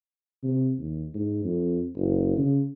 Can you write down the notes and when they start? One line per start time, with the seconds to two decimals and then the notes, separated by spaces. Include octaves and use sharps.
0.43 C3
0.78 D#2
1.14 G#2
1.44 F2
1.96 F#1
2.38 C#3